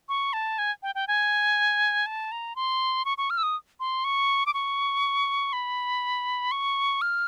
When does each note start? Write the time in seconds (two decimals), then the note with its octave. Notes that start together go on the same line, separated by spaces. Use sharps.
0.09 C#6
0.33 A5
0.58 G#5
0.83 G5
0.95 G5
1.08 G#5
2.06 A5
2.32 A#5
2.56 C6
3.05 C#6
3.18 C#6
3.30 F6
3.38 E6
3.43 D#6
3.80 C6
4.04 C#6
4.46 D6
4.54 C#6
5.53 B5
6.51 C#6
7.02 F6